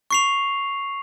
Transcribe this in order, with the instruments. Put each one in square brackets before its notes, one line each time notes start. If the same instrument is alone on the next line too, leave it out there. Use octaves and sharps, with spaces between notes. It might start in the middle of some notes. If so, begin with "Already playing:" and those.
[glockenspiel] C#6 C7 F7